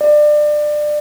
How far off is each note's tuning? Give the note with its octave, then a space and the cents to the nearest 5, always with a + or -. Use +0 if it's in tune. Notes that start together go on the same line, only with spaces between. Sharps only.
D5 +25